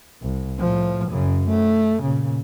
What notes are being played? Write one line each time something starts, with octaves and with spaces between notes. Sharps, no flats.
C2
A2 F3
F#2 C#3
A3
A#2 C#3